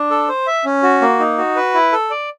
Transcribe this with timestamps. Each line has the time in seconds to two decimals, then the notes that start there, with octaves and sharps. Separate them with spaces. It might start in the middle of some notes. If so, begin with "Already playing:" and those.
Already playing: D4
0.11 A4
0.29 C5
0.47 E5
0.65 C#4
0.83 F#4
1.01 A#3
1.19 D#4
1.38 F#4
1.56 B4
1.74 E4
1.92 A4
2.10 D5